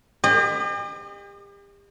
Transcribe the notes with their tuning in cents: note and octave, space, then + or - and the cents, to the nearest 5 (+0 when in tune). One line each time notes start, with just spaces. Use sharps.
G4 +40 D#5 -35